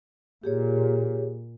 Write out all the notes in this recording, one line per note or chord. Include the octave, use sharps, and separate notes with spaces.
A#2 G4 G#4 C#5